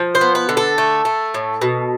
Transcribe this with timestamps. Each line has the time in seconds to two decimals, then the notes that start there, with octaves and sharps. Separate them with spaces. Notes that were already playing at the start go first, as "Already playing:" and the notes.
Already playing: F3
0.15 C5
0.21 B3
0.35 B4
0.49 D3
0.57 A4
0.78 A3
1.05 A3
1.34 A2
1.62 B2